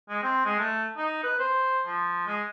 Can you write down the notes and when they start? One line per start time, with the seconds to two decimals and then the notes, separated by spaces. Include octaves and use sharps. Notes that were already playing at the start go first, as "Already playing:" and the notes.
0.09 G#3
0.22 C4
0.45 G#3
0.59 A3
0.97 D#4
1.23 B4
1.39 C5
1.86 F3
2.26 G#3